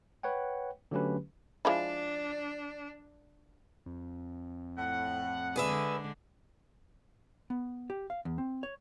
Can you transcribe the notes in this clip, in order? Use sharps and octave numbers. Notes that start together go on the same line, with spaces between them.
B4 C#5 F#5 G5
D3 F#3 A3 C#4 G4 B4
F3 G#3 D4 E4
F2
A2 F#5
D3 G#3 D4 G#4 B4 E5
B3
G4
F5
E2
C4
C#5